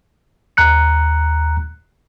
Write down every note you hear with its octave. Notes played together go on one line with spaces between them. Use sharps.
D#2 A#5 F#6 C#7